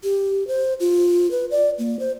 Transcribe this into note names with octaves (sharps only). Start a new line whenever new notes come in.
G4
C5
F4
B4
D5
A#3
C5